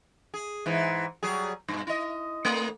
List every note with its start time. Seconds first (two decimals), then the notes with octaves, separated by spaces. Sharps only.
0.34 G#4
0.66 G#2 E3
1.23 F#3 G3 G#4
1.68 G2 B2
1.87 E4 D#5
2.45 A3 A#3